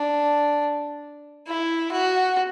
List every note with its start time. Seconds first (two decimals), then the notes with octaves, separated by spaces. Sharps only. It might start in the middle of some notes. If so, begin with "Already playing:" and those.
Already playing: D4
1.47 E4
1.92 F#4